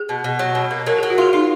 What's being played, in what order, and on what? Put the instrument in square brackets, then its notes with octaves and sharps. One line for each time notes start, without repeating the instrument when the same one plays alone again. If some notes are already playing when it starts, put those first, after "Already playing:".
Already playing: [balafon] G#4
[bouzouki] B2
B2
F#3
B2
A#3
[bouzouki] F#3 [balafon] A#4
[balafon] G#4
[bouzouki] F#3
[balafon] F#4
[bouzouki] F4 [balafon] G#4
[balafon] D#4 [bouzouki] F4